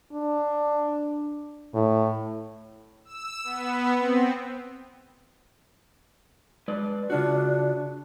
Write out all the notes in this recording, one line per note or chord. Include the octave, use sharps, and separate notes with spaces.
D4
A2
E6
B3
C4
G#3 B4 D5
C#3 D4 F4 F#4